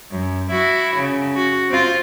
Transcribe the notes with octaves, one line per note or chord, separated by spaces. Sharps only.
F#2
E4 F#4
C#3
F#4
C4 F4